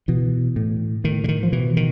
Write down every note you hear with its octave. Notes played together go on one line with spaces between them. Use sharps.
B2 E3
A2
A2 D#3
D3
D#3
F3
B2 E3
D#3